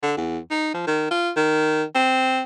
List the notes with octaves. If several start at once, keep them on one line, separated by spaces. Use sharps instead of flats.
D3
E2
D#4
F3
D#3
F4
D#3
C4